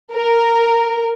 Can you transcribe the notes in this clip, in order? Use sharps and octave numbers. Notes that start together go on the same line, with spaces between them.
A#4